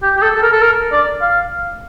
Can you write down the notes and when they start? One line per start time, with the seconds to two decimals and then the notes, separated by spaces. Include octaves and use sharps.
0.02 G4
0.17 G4
0.22 A4
0.35 A4
0.42 A#4
0.52 A4
0.62 A#4
0.92 D5
1.22 F5